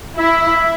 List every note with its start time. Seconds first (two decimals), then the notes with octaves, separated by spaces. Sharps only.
0.18 E4 E5